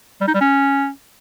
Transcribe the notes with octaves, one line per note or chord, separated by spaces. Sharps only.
G3
D#4
G3
C#4